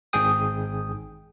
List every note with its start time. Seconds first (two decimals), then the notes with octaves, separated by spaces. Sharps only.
0.13 G#1 G#2 G#4 G5 D#6